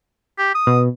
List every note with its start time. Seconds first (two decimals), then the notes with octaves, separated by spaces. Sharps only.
0.38 G4
0.55 D#6
0.67 B2